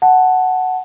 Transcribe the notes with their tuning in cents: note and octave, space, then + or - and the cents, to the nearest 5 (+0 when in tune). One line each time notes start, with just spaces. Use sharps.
F#5 +0 A5 +0